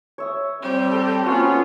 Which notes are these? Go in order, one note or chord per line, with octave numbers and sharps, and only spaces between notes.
C#5 E5 D#6
G3 C4 G4
A4
A#3 B3 C#4 F4 F#4 C#6